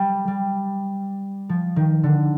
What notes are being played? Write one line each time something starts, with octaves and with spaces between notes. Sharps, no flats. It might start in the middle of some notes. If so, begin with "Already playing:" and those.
Already playing: G3
G3
F3
D#3
D3